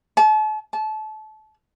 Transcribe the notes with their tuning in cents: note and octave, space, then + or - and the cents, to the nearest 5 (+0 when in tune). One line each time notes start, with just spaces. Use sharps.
A5 -40
A5 -25